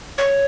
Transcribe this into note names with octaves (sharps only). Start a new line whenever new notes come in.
C#5